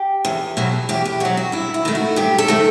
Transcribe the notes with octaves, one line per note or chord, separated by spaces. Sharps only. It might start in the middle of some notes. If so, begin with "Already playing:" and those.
Already playing: G4
E2
B2 F#3
E2 G4
G4
B2 F#3 F#4
F#4
G2 E4
E4
D#3 A3
F#4
G2 G4
A4
D#3 A3